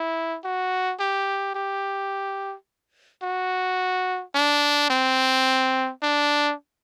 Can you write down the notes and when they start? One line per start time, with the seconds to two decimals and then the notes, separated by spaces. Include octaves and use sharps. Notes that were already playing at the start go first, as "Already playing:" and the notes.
Already playing: E4
0.44 F#4
1.00 G4
1.55 G4
3.23 F#4
4.35 D4
4.90 C4
6.03 D4